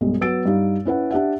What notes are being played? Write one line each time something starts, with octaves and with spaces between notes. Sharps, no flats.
B1 G2 G#3
F#3 B3 E6 A6 D7
G2 G3 D#4 F5
C#4 E4 B4 F#5
D4 G4 E5 F#5